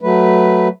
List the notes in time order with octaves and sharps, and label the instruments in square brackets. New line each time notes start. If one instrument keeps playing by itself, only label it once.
[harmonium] F#3 A3 B4